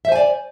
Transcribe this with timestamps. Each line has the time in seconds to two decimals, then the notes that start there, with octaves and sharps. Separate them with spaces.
0.05 E5
0.08 C5
0.12 G#5
0.16 D5